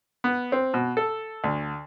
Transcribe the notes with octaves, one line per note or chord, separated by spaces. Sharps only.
B3
C4
B2
A4
D2